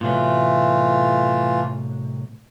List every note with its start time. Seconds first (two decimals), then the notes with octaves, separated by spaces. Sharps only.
0.01 A2 C3 E3 F#3 A3 F4